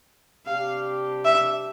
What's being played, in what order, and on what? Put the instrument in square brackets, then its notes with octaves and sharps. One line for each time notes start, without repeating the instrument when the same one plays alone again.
[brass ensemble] C3 G3 D4 G4 [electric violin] F5
[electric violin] E5